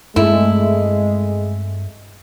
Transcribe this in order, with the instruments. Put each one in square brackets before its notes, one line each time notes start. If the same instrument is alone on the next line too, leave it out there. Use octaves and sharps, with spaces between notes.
[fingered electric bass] G2 C4 [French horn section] G#3 [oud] A3 [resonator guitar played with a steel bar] E4